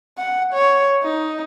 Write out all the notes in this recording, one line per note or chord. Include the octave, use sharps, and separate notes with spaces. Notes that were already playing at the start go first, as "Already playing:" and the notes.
F#5
C#5
D#4